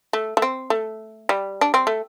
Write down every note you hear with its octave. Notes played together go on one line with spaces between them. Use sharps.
A3
A3
C4
A3
G3
D4
C4
A3